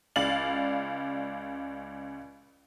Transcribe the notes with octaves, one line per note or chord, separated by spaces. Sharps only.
C#2 D5 F5 A6 F#7